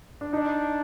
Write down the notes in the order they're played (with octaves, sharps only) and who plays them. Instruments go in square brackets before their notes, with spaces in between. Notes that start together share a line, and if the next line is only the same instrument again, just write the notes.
[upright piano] D4
[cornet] D4 [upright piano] D#4